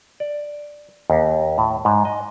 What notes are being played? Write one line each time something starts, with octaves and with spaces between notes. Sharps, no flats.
D5
D#2
A2
G#2
D#5